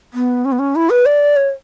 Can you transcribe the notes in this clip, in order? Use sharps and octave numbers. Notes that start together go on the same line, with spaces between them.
B3
C#4
B3
C#4
E4
B4
D5
C#5